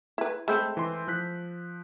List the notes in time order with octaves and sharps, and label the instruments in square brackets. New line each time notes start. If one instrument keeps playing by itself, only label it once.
[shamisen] E4 B4
[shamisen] G#3 A3 C4 [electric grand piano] B5 E6 G6
[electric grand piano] E3 C6
F3 F#6 B6